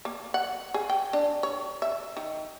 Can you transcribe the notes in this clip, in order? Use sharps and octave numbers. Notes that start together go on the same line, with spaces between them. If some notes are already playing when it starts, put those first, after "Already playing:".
A#3
F#5
G#4
G5
D4
C#5
E5
D#3